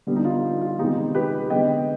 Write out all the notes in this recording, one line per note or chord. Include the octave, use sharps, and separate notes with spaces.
D3 G3 B3
D#4
F4
F4
C3 D#3 G#3 B3 D#4 G4
G4 B4
D3 G#3 B3 D#5 G5